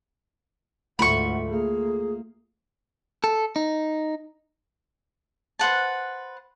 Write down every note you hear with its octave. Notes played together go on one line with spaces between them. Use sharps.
D2 G#2 A3 F4 F#5 B5 C#6
A#3 G#4
A4
D#4
B4 C5 F#5 A5